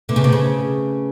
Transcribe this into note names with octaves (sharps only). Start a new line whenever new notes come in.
D3 A3 B3
C#3
C3
C#3